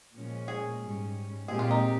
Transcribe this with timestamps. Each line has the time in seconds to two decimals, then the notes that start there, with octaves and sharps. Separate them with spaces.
0.15 A#2 F3 G#3 C#4
0.48 G#4
0.81 G#2 G3 C#4
1.48 A#2 G#3 C4 G4 G#4
1.59 F4
1.71 D#4